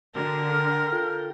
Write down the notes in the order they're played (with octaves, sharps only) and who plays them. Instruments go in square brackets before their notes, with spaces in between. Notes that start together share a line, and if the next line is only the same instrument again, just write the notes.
[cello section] D3 [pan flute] F#4 [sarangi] A#4 [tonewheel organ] G5
[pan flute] F6
[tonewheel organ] F4 A4 G5